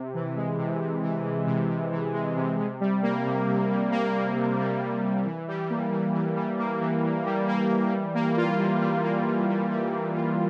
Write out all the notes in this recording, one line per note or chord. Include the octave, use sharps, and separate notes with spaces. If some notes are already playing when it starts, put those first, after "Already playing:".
Already playing: C3
E3
G#3
C3
C3
E3
G#3
C3
C3
E3
G#3
C3
C3
G3
A#3
C3
C3
G3
A#3
C3
C3
G3
A#3
C3
E3
G3
A#3
E3
E3
G3
A#3
E3
E3
G3
A#3
E3
G3
A#3
F4
G3
G3
A#3
F4
G3
G3
A#3
F4